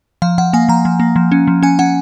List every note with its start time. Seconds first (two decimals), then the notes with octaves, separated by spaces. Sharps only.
0.22 F3 F5
0.38 F3 F#5
0.53 A#3 G#5
0.69 F3 A#5
0.85 F3
1.00 A#3
1.16 F3
1.32 C#4
1.47 F3
1.63 C#4 G#5
1.79 C#4 F#5